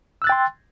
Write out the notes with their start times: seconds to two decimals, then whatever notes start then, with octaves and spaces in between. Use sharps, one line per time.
0.22 E6
0.24 F#6
0.27 A6
0.29 G5
0.32 C6